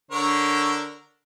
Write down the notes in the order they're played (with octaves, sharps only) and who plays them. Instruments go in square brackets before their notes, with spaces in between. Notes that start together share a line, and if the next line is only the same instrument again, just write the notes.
[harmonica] D3 A#4 C#5